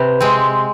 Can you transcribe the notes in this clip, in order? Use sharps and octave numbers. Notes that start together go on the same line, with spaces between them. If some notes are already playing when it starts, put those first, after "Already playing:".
Already playing: C3 B4
G#3 C4